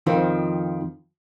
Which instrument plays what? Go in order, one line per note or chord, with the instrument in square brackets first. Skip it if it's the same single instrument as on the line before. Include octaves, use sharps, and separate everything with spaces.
[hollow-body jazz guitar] F2 D#3 F3 C4